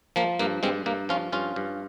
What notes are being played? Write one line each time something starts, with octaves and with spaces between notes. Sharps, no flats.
F3 A#3
G2 A#3
G2 G#3 C4
G2 A#3
F3 C#4 F4
G2 C#4 F4
G2